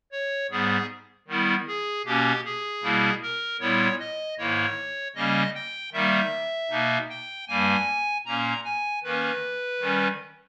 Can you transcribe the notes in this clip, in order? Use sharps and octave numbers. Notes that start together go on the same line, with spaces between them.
C#5
G#2 G3 B3 G#4
D#3 G3 B3 E4
G#4
B2 A#3 C#4 G4
G#4
B2 G3 A#3 E4
A#4
A#2 G3 B3 E4 C#5
D#5
G#2 D#3 A#3 E4 C#5
C#3 G3 A#3 C#4 D#5
G5
D#3 G3 A#3 D#4 E5
B2 A#3 D#4
G5
G2 G3 A#3 G#5
A#2 A#3 C#4 A#5
G#5
D#3 A#3 C#4 B4
D#3 G3 C#4